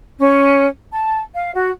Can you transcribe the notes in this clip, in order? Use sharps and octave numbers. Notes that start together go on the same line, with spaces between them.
C#4
A5
F5
F#4